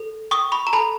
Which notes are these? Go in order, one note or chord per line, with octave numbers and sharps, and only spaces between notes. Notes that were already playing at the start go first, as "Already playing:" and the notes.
Already playing: A4
G5 C#6 D#6
B5 C#6
A#5
A4 A5 B5